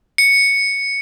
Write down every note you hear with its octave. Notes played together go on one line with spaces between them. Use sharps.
C#7